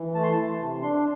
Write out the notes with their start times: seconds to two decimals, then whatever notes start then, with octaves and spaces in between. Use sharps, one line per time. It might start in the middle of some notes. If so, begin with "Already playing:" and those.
Already playing: E3
0.15 A3 A5
0.23 C6
0.32 A5
0.37 E3
0.59 C3
0.82 D4 C6